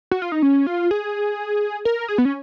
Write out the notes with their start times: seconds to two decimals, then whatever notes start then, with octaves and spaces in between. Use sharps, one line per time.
0.11 F#4
0.22 F4
0.32 D#4
0.42 C#4
0.67 F4
0.91 G#4
1.85 A#4
2.08 G#4
2.18 B3
2.25 C#4